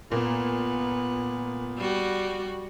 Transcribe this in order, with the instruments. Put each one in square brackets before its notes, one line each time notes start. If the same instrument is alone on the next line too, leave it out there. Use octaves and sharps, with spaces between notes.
[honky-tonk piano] A#2 A#3 [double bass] B3
[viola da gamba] G3 F#4